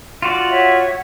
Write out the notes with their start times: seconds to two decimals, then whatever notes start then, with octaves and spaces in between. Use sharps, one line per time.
0.22 F4 F#4 D5
0.49 C#5 E5 F#5